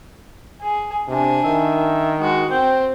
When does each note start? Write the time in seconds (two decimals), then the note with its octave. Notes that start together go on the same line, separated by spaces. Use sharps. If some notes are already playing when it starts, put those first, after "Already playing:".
0.61 G#4
1.08 C3 D4 G#5
1.44 D#3 E5
2.21 G#3 F#4
2.51 C4 G5